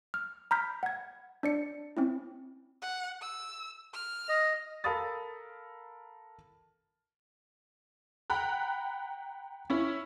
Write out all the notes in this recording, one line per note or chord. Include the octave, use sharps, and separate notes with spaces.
F6
A#5 B5 F6 G6 B6
F#5 G#6
D4 D5 C#7
C4 C#4 E4
F#5
E6
F6
D#5
A4 A#4 F5 B5 D#6 A6
F#5 G5 A#5 B5 F#6
C#4 E4 C#5